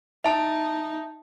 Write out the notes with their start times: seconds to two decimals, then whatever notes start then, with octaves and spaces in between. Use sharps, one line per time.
0.24 D#4 E5 A5